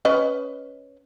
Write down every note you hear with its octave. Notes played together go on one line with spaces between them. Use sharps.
C#4 B4 D#5